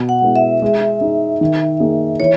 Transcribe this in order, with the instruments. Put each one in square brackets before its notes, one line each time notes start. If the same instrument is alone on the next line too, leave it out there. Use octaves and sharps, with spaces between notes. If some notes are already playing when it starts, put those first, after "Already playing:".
Already playing: [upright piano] B2
[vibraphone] F#5
[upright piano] G#3 B3 E4
[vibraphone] E5
[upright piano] G#3
D#4 G#4
D#3
A#3 D#4 G#4
[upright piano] E3 [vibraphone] C#5